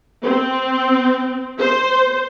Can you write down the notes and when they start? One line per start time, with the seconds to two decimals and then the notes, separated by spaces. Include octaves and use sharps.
0.23 C4
1.59 C5